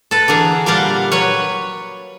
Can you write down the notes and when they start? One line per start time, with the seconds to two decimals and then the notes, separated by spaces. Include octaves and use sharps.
0.11 A4 B4
0.28 D3 E3 G#4 A#4
0.66 A#2 G3 G4 F5 F#5 A#5
1.12 F#3 B4 C#5